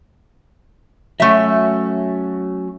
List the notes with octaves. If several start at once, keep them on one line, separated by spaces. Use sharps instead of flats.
F#3 A3 C#4 F#4 E5